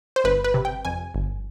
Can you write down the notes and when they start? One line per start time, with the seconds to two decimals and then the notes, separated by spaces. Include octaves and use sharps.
0.16 C5
0.24 G1 B4
0.44 B4
0.54 C3
0.65 G5
0.85 F2 G#5
1.15 G1